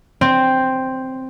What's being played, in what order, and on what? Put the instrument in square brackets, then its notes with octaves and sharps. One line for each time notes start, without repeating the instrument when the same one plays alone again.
[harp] C4